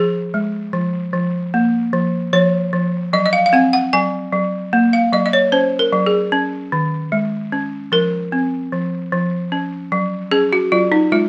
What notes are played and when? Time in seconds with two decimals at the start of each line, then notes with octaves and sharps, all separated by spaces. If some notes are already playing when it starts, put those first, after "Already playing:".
Already playing: F3 G#4
0.34 G#3
0.73 F3
1.13 F3
1.54 A#3
1.93 F3
2.33 F3 C#5
2.73 F3
3.13 F#3 D#5
3.26 D#5
3.33 F5
3.46 F5
3.53 C4 F#5
3.73 F#5
3.93 F#3 G#5
4.33 F#3
4.73 A#3
4.93 F5
5.13 F#3 D#5
5.26 D#5
5.33 C#5
5.52 C#4 C5
5.79 A#4
5.93 F#3
6.06 G#4
6.32 C#4
6.72 D#3
7.12 G#3
7.52 C#4
7.92 F3 A#4
8.32 C4
8.72 F3
9.12 F3
9.52 C#4
9.92 F#3
10.31 C#4 G#4
10.53 F#4
10.72 F#3 F4
10.92 D#4
11.12 G#3 F4